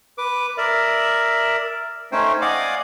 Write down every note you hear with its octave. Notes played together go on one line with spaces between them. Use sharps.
B4 D6
A#4 D5 E5
A3 C#4 D#4 C5 G5
D5 D#5 F5 F#5 G#5 D6